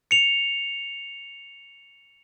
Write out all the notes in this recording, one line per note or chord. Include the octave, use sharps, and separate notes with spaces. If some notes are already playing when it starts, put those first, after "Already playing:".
C#7 F7